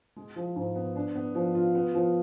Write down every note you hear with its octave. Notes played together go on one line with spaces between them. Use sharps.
G#3
F3
G#2
B3
D4
B3
F3
F4
B3
F3